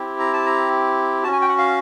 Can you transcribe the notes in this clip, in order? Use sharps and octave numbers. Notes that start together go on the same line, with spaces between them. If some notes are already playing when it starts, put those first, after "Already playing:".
Already playing: C4 E4 G4
A#5
A5
A#5
C#4 F#4 A5
G#5
G5
F#5
F5